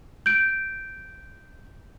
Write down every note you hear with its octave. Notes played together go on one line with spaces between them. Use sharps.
G6 D7